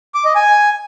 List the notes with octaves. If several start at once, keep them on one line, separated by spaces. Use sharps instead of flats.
D6
D#5
G#5